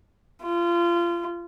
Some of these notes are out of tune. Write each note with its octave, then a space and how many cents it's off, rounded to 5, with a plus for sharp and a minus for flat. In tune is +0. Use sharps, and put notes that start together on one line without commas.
F4 -25